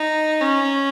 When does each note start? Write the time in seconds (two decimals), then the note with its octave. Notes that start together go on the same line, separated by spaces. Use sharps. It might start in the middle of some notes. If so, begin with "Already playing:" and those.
Already playing: D#4
0.41 C#4